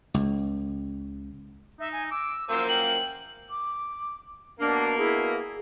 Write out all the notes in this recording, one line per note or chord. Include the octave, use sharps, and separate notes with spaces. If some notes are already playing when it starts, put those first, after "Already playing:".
C#2
D#4 E5
G#5
D6 E6
F#2 F3 A#3 C5 E6
G5 F#7
D6
B2 A#3 D4
E4 G#4